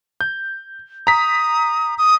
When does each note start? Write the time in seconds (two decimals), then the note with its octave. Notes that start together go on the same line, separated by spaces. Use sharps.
0.21 G6
1.07 A#5 D#6 B6
1.98 D#6